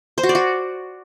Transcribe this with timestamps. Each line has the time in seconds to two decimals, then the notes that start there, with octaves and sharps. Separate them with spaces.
0.18 C5
0.23 F#4
0.29 D5
0.35 F#4